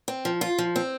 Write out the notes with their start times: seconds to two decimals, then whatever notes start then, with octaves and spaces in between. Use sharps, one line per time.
0.08 C4
0.25 F3
0.41 F4
0.58 F3
0.76 C4